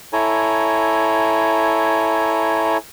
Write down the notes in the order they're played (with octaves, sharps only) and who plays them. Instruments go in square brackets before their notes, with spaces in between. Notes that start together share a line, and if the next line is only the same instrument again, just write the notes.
[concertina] E4 A4 C#5 G#5 A#5